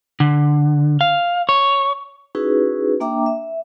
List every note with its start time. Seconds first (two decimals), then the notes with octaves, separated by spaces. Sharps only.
0.20 D3
1.01 F5
1.49 C#5
2.35 C#4 D#4 E4 F#4 G#4 B4
3.00 A#3 D4 E5 G5 A#5 D6
3.26 E5